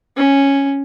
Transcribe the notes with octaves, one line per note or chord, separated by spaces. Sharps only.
C#4